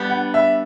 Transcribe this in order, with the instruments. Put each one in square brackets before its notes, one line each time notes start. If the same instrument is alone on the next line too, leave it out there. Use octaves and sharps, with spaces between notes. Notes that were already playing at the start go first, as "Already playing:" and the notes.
Already playing: [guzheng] G3 B3 D4 G4 B4
[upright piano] F#5
E5